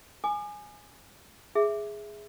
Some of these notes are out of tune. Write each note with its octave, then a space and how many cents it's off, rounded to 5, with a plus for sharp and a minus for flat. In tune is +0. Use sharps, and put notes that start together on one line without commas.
G#5 +0 D6 +45
G#4 +0 E5 +0